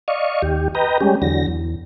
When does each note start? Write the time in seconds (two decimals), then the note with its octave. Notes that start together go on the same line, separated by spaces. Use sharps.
0.08 D5 D#5 F5 C#6
0.42 D#2 G4
0.75 B4 D#5 G5 A#5
1.01 G3 G#3 C#4 G4
1.22 E2 D3 F#3 A#6
1.48 E2